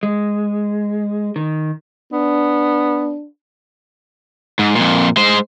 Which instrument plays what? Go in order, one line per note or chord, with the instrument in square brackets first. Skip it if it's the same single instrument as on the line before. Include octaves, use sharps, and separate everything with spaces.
[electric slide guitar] G#3
D#3
[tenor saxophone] B3 [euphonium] D4
[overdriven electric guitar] G#2
F2 A#2
G#3 C5